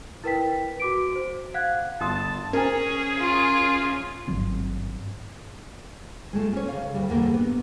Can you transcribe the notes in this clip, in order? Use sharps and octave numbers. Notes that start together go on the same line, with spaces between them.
E4 A#4 B4 G5 B6
F#4 D6 D7
C5
F5 F#5 F#6 G#6
G1 A5 C6 D#6
C#4 G#4 A#4 C5 G#5
F4
G#1 G2 F#3 C4
G#3 A3 F4
C#4 C#5
C#3 F5
D2 G3
E2 A2 D3 G3 A#3 A#4
B3